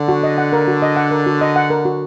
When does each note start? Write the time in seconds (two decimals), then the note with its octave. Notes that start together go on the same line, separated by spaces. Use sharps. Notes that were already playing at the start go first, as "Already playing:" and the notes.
Already playing: D3
0.08 F#4
0.23 D#5
0.38 F#5
0.53 A#4
0.68 F#4
0.82 D#5
0.96 F#5
1.11 A#4
1.26 F#4
1.41 D#5
1.56 F#5
1.70 A#4
1.85 F#4